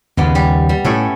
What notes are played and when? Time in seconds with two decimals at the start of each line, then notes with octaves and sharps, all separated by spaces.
0.17 D#2 C#3 G#3 B3 D5
0.35 G3 G4
0.69 G3
0.85 A2 A3 C#4 E4